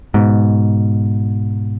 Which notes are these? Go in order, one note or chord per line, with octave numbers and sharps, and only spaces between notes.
G#2 B2